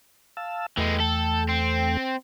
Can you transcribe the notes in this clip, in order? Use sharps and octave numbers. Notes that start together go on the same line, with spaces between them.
F5 A5 E6
E2 E3 G#3 A3 G5
A4
C4